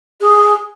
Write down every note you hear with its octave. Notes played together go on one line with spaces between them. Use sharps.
G#4